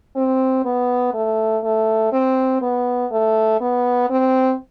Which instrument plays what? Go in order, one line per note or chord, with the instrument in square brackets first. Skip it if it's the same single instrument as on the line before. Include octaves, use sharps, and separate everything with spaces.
[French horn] C4
B3
A3
A3
C4
B3
A3
B3
C4